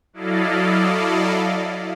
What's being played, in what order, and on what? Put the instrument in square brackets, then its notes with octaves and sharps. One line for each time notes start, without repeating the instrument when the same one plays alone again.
[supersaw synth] F#3 E4 A4 D5 D#5 F5